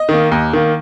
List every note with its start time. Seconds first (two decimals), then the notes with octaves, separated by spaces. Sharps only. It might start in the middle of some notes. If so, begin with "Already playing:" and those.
Already playing: D#5
0.09 D#3 A#3
0.32 D#2
0.53 D#3 A#3